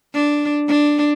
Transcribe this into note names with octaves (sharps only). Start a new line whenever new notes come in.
D4
D4